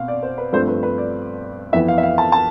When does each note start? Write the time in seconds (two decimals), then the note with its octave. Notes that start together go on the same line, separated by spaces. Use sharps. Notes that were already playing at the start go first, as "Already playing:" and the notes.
Already playing: B2 C4 F5
0.08 D5
0.23 C5
0.38 B4
0.53 G2 F3 A3 C4 C5
0.67 B4
0.83 B4
0.98 D5
1.73 F2 E3 B3 E5
1.88 F5
1.98 E5
2.03 F5
2.18 A5
2.32 A5